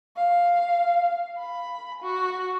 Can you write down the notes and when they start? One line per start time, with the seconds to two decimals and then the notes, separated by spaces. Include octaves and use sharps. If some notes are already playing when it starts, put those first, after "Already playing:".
0.16 F5
1.38 B5
2.02 F#4